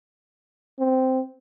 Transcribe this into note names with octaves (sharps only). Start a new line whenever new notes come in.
C4